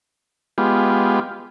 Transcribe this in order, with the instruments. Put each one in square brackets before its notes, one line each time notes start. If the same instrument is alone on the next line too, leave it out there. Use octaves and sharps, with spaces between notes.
[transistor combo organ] G#3 B3 F4 G4